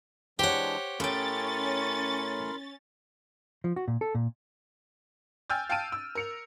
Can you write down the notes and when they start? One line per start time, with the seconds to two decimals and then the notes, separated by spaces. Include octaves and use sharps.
0.39 E3 G#3 D4 G4 C5 C#5 F#5
1.00 A2 C#4 A#4 G5 B5 C6 A6
3.64 F3
3.76 F#4
3.88 A#2
4.01 A4
4.15 A#2
5.50 G5 G#5 E6 F6 G6 A6
5.70 F5 G5 A5 F6 D7 D#7
5.92 E6
6.15 A#4 C#7 F7